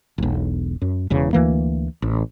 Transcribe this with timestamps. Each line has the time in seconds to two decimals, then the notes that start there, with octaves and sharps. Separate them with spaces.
0.18 E1 B1
0.81 F#2
1.10 E1 E2 C#3
1.33 D2 E3 A#3
2.02 A1